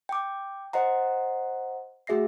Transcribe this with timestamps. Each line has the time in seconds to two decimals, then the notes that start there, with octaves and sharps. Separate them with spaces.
0.09 G5 D6
0.73 C5 D#5 F#5 A#5
2.07 A3 F#4 G#4 E5 A#6 C7